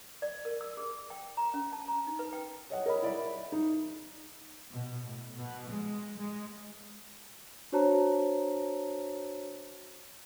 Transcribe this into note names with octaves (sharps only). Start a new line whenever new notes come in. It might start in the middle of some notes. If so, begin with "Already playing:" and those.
D5
A#4
E6
G#4
G5
A#5
C#4
A5
A#5
D#4
B4
G5
C#5 D#5 F#5
A#4 C#5 D#5 B5
E4 D5 B5
D#4
B2
A2
B2
G#3
G#3
D4 F#4 C5 C#5 A5 A#5